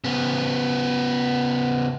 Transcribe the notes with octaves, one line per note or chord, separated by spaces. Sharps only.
C#3 B3